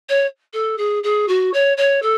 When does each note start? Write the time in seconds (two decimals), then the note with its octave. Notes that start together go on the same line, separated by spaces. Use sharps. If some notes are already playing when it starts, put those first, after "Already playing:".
0.09 C#5
0.53 A4
0.78 G#4
1.03 G#4
1.28 F#4
1.53 C#5
1.77 C#5
2.02 A4